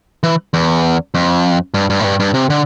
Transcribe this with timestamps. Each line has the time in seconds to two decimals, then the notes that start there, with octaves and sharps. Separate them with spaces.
0.23 E3
0.54 E2
1.15 F2
1.74 G2
1.90 G2
2.00 A2
2.04 G2
2.20 G2
2.34 C3
2.50 D3